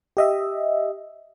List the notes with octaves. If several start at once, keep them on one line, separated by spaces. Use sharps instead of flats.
G4 D#5 E5